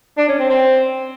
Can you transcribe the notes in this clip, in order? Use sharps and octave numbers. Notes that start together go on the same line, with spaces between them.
D4
C#4
C4
C4